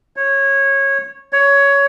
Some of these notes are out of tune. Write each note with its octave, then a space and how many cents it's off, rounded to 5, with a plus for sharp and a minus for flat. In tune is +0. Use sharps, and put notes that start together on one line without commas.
C#5 -15
C#5 +15